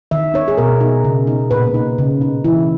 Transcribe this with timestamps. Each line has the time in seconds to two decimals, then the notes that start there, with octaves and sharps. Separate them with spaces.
0.11 D#3 E5
0.34 D#4 C#5
0.48 G#4
0.58 B2 A#4
0.81 D#4
1.04 C#3
1.27 D#4
1.51 A#2 B4
1.74 D#4
1.98 C#3
2.21 D#4
2.44 E3 E4